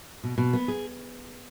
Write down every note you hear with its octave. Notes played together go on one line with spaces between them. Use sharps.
B2
B2
B3
G#4